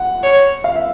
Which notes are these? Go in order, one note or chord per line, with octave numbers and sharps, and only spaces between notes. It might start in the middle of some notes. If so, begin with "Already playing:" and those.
Already playing: F#5
C#5
F5
E5